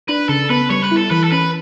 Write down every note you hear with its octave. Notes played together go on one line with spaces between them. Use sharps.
D4 B4
C#3 A4
B3 B4
G3 C#5
B4
E4
A4
E3 B4
A4
C#4 B4